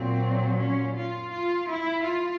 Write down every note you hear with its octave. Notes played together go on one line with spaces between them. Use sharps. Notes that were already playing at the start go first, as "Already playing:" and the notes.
Already playing: A#2 F#3 C4
C#4
F4
F4
E4
F4